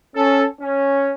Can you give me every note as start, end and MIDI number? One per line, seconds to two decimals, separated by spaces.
0.16 0.45 61
0.16 0.45 69
0.61 1.13 61